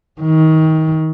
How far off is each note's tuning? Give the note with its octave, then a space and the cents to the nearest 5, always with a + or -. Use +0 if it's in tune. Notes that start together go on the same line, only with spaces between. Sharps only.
D#3 +25